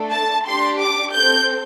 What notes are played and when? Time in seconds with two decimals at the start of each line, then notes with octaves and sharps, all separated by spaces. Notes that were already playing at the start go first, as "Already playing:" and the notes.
Already playing: A3 D4 A4
0.12 A5
0.45 D4 G4 C6
0.78 D6
1.11 C4 A4 G6